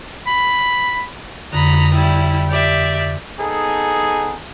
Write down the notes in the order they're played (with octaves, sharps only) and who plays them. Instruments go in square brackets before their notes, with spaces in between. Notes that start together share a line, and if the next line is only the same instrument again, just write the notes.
[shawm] B5
[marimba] F2 D3 [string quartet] A#5 B5 D#6
[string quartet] G3 E4
G4 D5 E5
[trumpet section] B3 D#4 G#4 A4